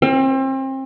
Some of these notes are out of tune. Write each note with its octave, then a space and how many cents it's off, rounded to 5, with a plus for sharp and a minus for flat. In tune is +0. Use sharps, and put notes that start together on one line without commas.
C4 +35